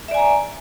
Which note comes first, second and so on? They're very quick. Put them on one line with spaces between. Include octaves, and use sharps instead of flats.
E5 D5 G#5 A#5